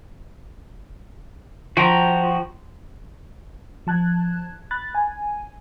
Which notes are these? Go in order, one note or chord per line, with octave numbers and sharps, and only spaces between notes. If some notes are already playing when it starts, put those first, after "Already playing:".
F3 F#4 G5 A#5
F3 A5 F#6 G#6
B5 F#6 A6
G#5